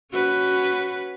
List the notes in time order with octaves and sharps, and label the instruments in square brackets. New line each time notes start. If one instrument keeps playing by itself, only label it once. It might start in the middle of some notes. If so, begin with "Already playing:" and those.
[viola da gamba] C#4 F#4 B4